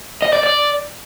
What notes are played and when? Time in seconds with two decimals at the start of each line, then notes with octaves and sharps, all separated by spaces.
0.22 D#5
0.33 D5
0.43 D5